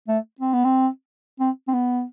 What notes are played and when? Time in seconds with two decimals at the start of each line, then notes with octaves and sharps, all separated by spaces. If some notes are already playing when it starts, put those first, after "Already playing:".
0.08 A3
0.41 C4
0.53 B3
0.65 C4
1.40 C4
1.68 C4
1.73 B3